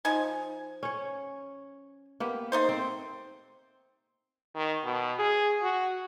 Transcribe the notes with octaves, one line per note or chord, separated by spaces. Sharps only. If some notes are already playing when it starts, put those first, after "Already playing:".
F3 D#4 G#5
C#4 C#5
A#3 B3 G4
A3 D#4 C5
C4
D#3
B2
G#4
F#4